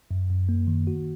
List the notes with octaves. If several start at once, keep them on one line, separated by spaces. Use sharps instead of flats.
F#2
F#2
A#3
D#3
F#4